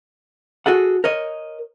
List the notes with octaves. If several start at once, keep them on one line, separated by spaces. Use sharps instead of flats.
F#4 G#4 A4 F#5
A#4 C#5 D#5